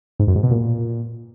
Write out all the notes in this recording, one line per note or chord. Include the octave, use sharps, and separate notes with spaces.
G#2
F#2
G#2
B2
A#2